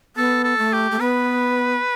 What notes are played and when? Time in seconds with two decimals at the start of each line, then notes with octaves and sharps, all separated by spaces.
0.16 B3 A4
0.44 A4
0.59 A3
0.73 G4
0.91 A3
1.00 B3 B4